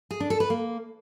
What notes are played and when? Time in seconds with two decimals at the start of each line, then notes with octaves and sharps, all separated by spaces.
0.11 G#4
0.20 D4
0.30 A4
0.40 B4
0.50 A#3